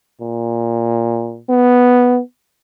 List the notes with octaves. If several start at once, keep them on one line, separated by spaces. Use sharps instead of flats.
A#2
B3